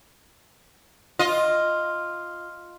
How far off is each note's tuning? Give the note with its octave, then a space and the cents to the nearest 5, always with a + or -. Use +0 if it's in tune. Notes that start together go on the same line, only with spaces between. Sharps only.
F4 +0 D#5 +0